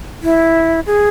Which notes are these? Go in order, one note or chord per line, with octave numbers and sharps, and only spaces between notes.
E4
G#4